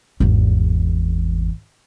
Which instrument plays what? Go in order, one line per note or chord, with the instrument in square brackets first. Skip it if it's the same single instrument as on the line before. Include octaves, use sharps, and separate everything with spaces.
[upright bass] G#1 E2